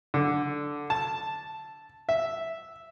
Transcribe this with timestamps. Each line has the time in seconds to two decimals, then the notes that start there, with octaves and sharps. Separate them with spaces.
0.14 D3
0.90 A5
2.09 E5